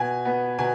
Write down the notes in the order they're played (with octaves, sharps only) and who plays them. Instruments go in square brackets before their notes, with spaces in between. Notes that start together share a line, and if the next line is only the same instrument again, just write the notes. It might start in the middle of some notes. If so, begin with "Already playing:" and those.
Already playing: [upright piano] B2 G#5
B3
B2 G#5